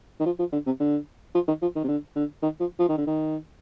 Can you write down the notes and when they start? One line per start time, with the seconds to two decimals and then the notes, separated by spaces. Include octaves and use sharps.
0.20 D#3
0.26 F3
0.39 F3
0.53 D3
0.66 C3
0.80 D3
1.35 F3
1.48 D#3
1.62 F3
1.76 D#3
1.84 C3
1.88 D3
2.16 D3
2.43 D#3
2.60 F3
2.80 F3
2.89 D#3
2.98 D3
3.07 D#3